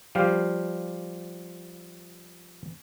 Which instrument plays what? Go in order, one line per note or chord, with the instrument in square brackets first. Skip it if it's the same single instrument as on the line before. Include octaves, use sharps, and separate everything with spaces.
[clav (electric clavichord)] F3 G3 G4 F5